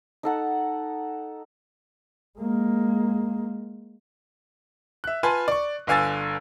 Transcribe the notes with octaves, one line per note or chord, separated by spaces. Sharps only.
D#4 A4 F#5
G#3 A#3
E5 F#6
F4 B4 G#5 A5 B5 C6
D5 C#6
G1 D3 F5 G#5 E6 A6